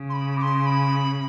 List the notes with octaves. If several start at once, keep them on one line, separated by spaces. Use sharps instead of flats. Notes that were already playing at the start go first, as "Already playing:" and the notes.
Already playing: C#3
C6
B5
D6
C6
B5